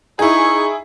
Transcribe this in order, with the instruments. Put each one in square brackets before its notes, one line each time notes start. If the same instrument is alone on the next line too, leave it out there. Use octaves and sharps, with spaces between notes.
[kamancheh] D#4 C#6 [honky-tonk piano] E4 G#4